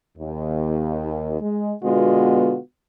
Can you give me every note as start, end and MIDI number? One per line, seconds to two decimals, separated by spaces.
0.18 1.37 39
1.41 1.74 56
1.83 2.57 47
1.83 2.57 50
1.83 2.57 56
1.83 2.57 59
1.83 2.57 65
1.83 2.57 66